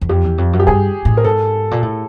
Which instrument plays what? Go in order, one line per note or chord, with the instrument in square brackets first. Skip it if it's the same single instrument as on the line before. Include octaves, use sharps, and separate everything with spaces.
[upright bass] E2
[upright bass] F2 [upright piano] G4
[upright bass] E2
F2
F#2
[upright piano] G4
[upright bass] G2 [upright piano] G#4
[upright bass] A2
[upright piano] A#4
[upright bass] G#2 [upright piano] A4
[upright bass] A#2
A2